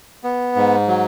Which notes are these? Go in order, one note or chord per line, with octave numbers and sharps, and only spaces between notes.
B3
G#2
F#3